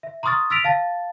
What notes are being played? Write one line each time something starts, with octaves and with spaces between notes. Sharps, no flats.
E5
A#5 C6 C#6 D#6 F6 A6
E6 F6 A6 B6 D7 F7
F5 A5 A6